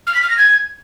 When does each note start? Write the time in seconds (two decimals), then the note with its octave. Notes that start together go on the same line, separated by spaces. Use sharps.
0.07 F6
0.14 B6
0.22 F6
0.30 A#6
0.37 G#6